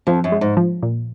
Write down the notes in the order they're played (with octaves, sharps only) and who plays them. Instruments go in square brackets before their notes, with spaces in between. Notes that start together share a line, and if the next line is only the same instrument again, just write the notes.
[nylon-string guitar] F2 [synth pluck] F3
[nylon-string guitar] F#2
[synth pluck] G#3
[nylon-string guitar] G#2
[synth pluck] F3
A#2